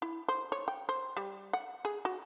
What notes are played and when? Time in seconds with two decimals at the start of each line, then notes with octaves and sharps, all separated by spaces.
0.02 E4
0.29 C5
0.52 C#5
0.68 G5
0.89 C5
1.17 G3
1.53 F#5
1.85 G#4
2.05 F#4